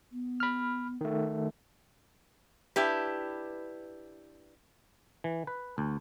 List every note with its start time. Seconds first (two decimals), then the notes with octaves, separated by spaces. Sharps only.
0.11 B3
0.40 B5 F6
1.01 D#3 A3
2.76 D4 E4 G4 B4
5.24 E3
5.47 B4
5.78 D2